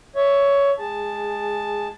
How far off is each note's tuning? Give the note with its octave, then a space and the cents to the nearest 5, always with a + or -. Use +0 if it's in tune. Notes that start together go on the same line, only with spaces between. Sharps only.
C#5 +15 E5 +0
G#3 +0 G#4 -15 A5 +0